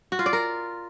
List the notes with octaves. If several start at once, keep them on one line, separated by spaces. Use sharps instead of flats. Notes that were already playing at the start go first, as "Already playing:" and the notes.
F#4
F4
D5
A#4